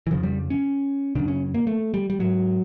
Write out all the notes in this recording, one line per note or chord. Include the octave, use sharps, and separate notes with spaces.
E3
F2 C#3 F3
G3
C#4
F#2 C#3 D4
C#4
A#3
A3
G3
G3
G#2 F#3